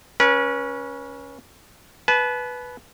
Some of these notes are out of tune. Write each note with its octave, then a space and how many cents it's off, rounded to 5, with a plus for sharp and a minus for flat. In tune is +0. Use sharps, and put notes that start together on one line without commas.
C#4 +0 B4 -35
B4 +0 A5 -40